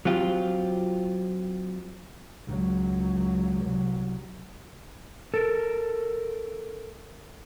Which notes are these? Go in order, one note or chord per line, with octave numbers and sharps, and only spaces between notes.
F#3 C4 F4 G4
C#2 F#3
C2 F#3
A4 A#4